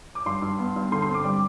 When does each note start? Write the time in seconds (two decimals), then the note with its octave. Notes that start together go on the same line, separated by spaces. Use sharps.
0.15 D6
0.26 G2 C6
0.42 G2
0.59 B3
0.76 G2
0.92 D3 C6
1.02 C6
1.09 C4
1.14 D6
1.24 G3